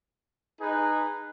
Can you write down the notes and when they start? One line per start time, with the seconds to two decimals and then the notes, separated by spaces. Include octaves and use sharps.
0.60 D#4 G#4 B4